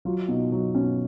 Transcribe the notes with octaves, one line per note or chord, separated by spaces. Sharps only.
F#3 F4
B2 D#4
F#3
B2 C#4